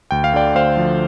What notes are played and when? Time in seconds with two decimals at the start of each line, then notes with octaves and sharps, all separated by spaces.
0.11 D2 G5
0.24 F5
0.34 D3 D5 G5
0.55 D2 C5 F5
0.77 F3